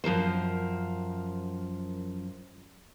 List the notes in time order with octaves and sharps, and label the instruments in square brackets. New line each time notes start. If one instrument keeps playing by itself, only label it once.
[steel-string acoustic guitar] F#2 F3 A#4 C5